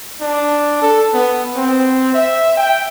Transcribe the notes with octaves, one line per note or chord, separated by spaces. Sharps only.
D4
A4
B3
C4
E5
G5